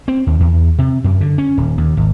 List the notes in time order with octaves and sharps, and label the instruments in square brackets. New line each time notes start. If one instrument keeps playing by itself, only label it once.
[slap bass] C4
D#2
E2
C3
F#2
D3
C#4
D#1
D#2
G#1